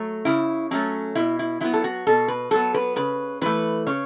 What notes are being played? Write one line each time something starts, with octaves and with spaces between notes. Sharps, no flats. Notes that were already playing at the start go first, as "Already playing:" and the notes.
Already playing: F#3 A3
C#3 E4
F#3 A3 C#4
B2 E4
E4
F#3 B3 E4
A4
F#4
B2 A4
B4
F#3 B3 A4
B4
C#3 B4
E3 A3 B4
C#3 C#5